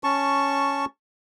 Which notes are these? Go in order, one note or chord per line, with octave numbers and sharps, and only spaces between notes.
C#4 A5 C#6